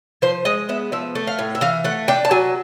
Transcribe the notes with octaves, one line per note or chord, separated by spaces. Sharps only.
F3 C5
G#3 D#5
B3 E5
F3 E5
A3
F5
A2
E5
E3 F5
A3 F#5
D4 G5
A5
F#3 G#5